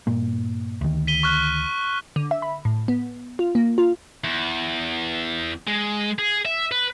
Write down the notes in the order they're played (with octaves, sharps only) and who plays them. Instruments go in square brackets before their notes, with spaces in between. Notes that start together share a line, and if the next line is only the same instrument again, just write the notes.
[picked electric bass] G2 A#2 A#3
D2 D#3
[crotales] B6 D#7 G7
C#6 F6 F#6
[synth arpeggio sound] D3
E5
B5
A2
B3
F4
A#3
F4
[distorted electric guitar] E2
G#3
G#4
E5
B4